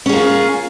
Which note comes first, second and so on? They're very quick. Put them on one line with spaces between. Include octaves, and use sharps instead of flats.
C#4 G#4 A#3 F4